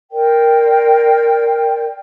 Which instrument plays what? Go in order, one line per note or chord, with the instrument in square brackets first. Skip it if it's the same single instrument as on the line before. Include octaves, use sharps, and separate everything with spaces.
[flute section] A#4 C5 D5 G5